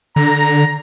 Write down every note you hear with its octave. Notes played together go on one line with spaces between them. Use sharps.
D3 A#5